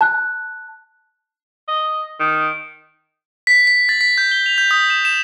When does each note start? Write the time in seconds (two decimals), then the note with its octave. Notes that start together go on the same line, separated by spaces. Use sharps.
0.01 A5 F#6
1.68 D#5
2.20 D#3
3.47 B6
3.67 B6
3.89 A6
4.01 B6
4.18 G6
4.32 G7
4.46 F7
4.58 G6
4.71 D#6
4.90 E7
5.05 E7